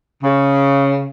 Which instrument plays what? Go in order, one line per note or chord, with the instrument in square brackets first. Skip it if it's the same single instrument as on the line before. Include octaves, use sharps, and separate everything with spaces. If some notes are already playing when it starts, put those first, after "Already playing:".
[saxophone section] C#3